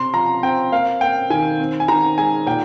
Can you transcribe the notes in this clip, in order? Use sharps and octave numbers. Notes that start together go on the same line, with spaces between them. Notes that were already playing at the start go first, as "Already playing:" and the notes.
Already playing: C3 C6
F3 A#5
C4 G5
A#3 F5
A#3 G5
D#3 G#5
C4
G#5
D#3 A#5
G#3 G#5
A#2 G5